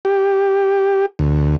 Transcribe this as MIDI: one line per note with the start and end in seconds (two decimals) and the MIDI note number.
0.05 1.06 67
1.19 1.56 38